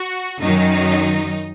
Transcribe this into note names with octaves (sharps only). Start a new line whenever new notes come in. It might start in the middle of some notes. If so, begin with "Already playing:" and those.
Already playing: F#4
F#2 D#3 F#3 D#4